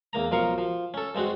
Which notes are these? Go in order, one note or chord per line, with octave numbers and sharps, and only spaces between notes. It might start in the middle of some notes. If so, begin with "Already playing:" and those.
E2 A#3 A#5
B1 F3 A#4 F5 C#6
F3
C#4 A4
G2 G#3 C4 F#4